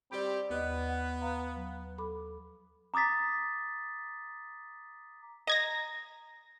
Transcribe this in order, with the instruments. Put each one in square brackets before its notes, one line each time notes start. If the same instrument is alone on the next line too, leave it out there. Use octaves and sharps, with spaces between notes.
[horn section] G3 C4 G4 [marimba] D5 B5
[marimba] D#2 D#5 [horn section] B3
[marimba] F#5
F5 A#5
F#3
A4 B5 D6
[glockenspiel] A#5 D6 D#6 A6 B6
[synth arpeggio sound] D#5 G#6 A#6 [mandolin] A#5